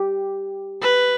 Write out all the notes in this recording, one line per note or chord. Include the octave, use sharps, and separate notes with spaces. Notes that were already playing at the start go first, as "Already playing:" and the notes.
Already playing: G4
B4